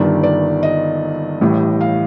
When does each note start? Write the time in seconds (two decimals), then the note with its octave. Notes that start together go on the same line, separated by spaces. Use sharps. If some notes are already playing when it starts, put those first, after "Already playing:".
Already playing: G1 G2 D#3 D5
0.23 D5
0.63 D#5
1.41 A1 A2 G3
1.81 F5